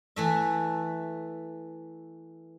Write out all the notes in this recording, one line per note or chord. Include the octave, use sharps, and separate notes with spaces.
E3 A3 E5